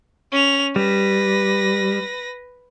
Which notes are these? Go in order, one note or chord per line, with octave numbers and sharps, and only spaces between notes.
C#4 F7
G3 B4 A#6